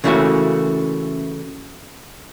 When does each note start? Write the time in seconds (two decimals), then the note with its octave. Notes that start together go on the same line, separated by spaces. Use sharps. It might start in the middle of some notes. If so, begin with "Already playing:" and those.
0.04 C#3 E3 A3 A#3 E4 F#4